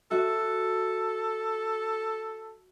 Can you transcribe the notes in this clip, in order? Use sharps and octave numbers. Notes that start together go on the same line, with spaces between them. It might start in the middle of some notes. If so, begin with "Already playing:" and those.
F#4 A4 E5